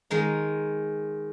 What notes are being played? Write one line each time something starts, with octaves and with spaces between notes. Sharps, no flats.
D#3 G#3 A#5